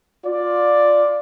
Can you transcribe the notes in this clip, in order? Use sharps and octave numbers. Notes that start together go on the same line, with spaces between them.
F4 D5